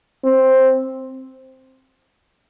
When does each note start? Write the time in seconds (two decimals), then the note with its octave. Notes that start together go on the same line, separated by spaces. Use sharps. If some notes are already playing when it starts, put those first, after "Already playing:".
0.25 C4